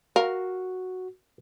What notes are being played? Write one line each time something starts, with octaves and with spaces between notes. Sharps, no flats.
F#4 A#4 F5